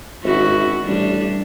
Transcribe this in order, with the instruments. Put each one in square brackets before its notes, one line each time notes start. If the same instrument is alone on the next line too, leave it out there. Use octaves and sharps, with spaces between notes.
[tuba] G#1 [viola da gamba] C#4 E4 F#4
[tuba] A1 [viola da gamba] G3 D4